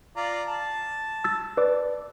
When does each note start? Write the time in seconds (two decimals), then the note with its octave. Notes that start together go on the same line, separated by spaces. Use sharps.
0.16 F4 D5 A#5
0.48 A5
1.24 E6 A6
1.57 B4 D5 D6